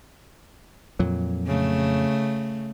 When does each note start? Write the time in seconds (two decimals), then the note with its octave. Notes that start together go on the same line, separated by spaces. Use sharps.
0.99 F2 A#2 F#3
1.47 C#3 A3